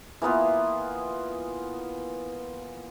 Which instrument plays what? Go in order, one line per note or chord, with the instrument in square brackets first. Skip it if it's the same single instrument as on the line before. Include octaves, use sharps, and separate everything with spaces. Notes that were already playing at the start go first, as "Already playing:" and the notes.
[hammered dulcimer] E3 A#3 B3 F4